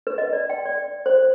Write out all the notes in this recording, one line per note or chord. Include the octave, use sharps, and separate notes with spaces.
B4
D#5
D5
G5
D5
C5